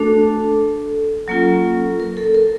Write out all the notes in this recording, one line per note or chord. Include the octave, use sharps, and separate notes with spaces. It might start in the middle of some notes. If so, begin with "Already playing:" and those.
Already playing: A3 D4 F#4 A4
F#3 A#3 C#4 F4
A#4
A4
A#4